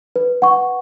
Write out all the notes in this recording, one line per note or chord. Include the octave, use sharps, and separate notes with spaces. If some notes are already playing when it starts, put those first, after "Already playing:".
B4
F#5 C#6